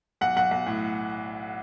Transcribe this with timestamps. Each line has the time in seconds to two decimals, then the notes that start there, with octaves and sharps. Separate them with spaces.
0.21 B1 F#5
0.36 B1 F#5
0.51 B1
0.66 A2